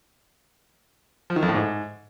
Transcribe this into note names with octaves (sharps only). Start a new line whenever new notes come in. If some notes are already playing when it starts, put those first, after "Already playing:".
F3
D#3
F2
A2
G#2